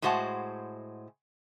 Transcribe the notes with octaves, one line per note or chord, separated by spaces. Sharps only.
A2 G#3 F#4 C5 F#5 A5